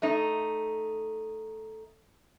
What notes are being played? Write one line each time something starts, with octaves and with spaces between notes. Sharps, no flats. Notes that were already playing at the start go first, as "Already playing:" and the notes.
A3 D#4